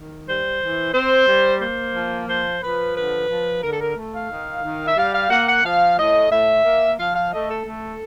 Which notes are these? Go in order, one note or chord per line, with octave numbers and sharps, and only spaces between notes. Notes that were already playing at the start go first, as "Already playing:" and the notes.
Already playing: D#3
G3 C5
E3
C4 C5
G3
A#3 C5
F3
F3 C5
F3 B4
D3 B4
F3
D3 A#4
A4
A#4
A3
F5
D#3
D#3
E5
G3 F5
F5
A#3 F#5
F#5
F3 F5
A2 D#5
A2 E5
A#3
F3 F5
F5
A3 D#5
A4
A3